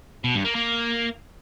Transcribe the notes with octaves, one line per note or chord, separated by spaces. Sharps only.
B2
G2
A#3
A#3